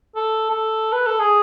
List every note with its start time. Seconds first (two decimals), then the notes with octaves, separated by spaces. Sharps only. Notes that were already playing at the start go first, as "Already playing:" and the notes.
0.16 A4
0.50 A4
0.93 B4
1.07 A4
1.20 G#4